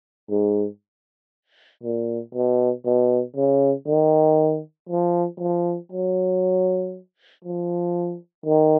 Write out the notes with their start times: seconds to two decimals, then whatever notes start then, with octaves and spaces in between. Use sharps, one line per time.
0.30 G#2
1.83 A#2
2.34 B2
2.85 B2
3.37 C#3
3.88 D#3
4.89 F3
5.40 F3
5.92 F#3
7.45 F3
8.46 D#3